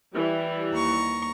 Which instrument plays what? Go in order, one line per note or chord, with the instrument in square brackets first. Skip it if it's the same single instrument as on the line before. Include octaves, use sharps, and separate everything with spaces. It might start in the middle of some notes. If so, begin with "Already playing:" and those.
[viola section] E3 G3
[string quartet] D#2 A#5 C#6